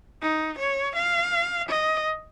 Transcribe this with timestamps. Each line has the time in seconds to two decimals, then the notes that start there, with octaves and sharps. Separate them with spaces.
0.22 D#4
0.59 C#5
0.96 F5
1.69 D#5